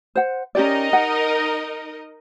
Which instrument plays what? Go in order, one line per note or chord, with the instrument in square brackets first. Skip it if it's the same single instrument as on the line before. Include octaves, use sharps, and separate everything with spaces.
[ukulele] C5 F#5
[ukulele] C#4 G4 D5 [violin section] D#4 A#4 D#5
[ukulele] F#5